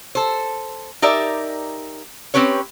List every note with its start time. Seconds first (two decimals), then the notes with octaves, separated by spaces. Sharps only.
0.15 A4 C5
1.02 D#4 G4 A#4 D5 E5
2.34 C4 C#4 G4 B4 C#5